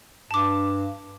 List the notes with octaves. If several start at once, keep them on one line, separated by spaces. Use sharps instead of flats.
G2 A5 D6